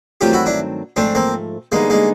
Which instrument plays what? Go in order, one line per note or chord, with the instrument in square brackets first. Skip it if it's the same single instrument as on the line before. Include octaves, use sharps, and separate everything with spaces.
[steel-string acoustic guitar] G2 D#3 F#3 A3 C4 [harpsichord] F4 G4
[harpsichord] E4 F#4
D4 E4
[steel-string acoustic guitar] G#2 F3 A3 [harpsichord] C4 D4
[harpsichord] A#3 C4
[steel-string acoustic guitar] D3 G3 B3 D#4 [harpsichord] G#3 A#3
[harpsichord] G#3 A#3